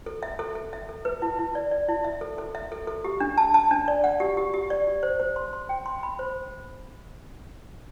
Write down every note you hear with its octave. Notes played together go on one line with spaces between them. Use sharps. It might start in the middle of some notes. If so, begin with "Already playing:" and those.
A4
E5
A4
A4
E5
A4
B4
E4
E4
D5
D5
E4
E5
A4
A4
E5
A4
A4
G4
D4
A5
A5
D4
D5
F#5
G4
G4
G4
D5
G4
C5
C5
C6
C6
G5
C6
B5
C5